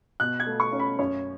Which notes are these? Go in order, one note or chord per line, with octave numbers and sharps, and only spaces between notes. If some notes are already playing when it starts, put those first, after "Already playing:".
B2 F#6
G#6
A3
C#6
C#4
B5
F#2 C#5